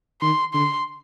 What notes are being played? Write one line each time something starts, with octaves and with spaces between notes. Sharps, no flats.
D#3 C6
D3 C6